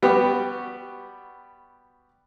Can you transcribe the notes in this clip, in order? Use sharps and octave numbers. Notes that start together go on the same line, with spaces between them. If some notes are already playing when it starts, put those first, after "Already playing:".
G3 B3 F#4 G4